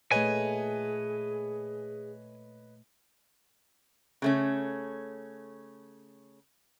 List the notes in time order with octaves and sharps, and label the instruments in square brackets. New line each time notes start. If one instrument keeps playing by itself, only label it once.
[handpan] A#2 A3 [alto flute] G#4 [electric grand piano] B4 C#5 D#5 [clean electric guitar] G#5
[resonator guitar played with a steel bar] C#3 A3 C#4